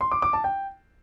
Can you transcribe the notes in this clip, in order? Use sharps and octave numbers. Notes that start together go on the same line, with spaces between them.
C6
D6
D6
A5
G5